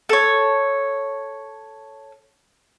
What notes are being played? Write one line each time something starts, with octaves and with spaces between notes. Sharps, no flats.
A4 C#5